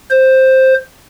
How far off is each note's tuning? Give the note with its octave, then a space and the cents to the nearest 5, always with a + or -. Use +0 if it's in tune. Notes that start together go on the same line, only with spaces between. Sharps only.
C5 +5